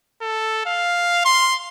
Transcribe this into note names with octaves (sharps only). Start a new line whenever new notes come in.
A4
F5
C6